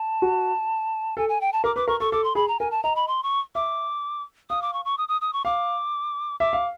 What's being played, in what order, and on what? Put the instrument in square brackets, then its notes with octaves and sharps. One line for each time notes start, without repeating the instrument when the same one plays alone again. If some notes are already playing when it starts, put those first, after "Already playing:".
Already playing: [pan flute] A5
[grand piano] F#4
[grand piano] A4 [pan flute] G#5
[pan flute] G#5
G5
A5
[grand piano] A#4 [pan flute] D6
[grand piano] B4 [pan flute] D6
[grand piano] A#4 [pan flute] C#6
[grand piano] A4 [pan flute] C#6
[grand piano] A4 [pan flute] D6
[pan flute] C6
[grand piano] G#4 [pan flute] B5
[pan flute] A#5
[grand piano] A#4 [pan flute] G#5
[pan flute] A5
[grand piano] D#5 [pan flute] A#5
[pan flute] B5
C6
C#6
[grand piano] E5 [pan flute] D6
[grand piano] F5 [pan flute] D#6
[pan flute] D6
C#6
C#6
D#6
D#6
D#6
C#6
[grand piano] F5 [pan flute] D6
[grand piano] E5 [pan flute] D6
[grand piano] F5